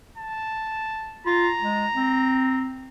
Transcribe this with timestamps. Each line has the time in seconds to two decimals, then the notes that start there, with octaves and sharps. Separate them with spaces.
0.18 A5
1.26 F4 A#5
1.62 G#3
1.95 C4